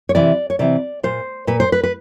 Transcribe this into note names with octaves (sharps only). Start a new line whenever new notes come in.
C#5
C3 E3 D5
C#5
C3 E3 D5
A#2 C5
A#2 B4
C5
B4
B4